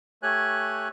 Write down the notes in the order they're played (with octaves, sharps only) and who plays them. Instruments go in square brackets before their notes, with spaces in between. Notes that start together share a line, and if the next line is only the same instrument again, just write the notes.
[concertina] A3 G4 C#5 G#5 F#6